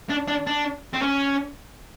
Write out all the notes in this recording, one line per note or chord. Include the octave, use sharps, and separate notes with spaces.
D4
D4
D4
C4
C#4